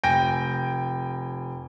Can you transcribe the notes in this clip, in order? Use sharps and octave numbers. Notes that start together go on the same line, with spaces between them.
F1 G5 G#5 G6 A#6 D7